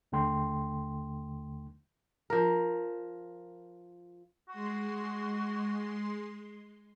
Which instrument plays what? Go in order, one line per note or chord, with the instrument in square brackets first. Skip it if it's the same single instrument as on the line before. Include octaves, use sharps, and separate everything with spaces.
[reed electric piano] D#2 D3 A3 G5 C6
[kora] F3 A#4
[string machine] G#3 C6 [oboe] F#4